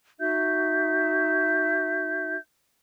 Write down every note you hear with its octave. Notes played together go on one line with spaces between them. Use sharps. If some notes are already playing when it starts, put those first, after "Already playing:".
D#4 F#4 E5 G6